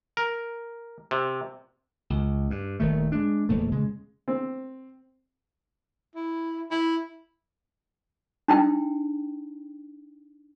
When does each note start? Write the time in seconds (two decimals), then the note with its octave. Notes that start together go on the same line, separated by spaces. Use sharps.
0.17 A#4
1.11 C3
2.10 C#2
2.50 G2
2.80 D#1 D#3 A3
3.12 G#3 D4
3.49 D1 E2 A#2 A3
3.72 C#3 G#3
4.28 C4
6.15 E4
6.71 E4
8.48 D4 D#4 G5